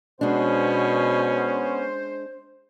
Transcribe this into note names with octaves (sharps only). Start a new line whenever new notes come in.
B2 G#3 B3 C#4 D4 C5